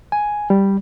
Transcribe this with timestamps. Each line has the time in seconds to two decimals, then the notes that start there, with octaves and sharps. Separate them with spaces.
0.12 G#5
0.50 G3